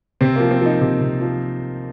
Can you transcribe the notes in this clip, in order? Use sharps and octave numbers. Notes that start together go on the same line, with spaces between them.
C3 C4
F3 A#3
C4
F3 D#4
C3
C3
F3